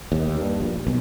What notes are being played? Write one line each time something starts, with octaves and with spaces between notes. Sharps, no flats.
D#2
G2
A#1
B1